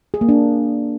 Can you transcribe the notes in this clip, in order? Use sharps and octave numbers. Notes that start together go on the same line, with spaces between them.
G#4
A#3
D4